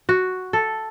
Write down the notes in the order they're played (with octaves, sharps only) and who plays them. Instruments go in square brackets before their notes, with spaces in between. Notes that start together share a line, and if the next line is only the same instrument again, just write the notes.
[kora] F#4
A4